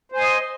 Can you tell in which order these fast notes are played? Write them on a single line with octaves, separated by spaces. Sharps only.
C5 G#5 D#5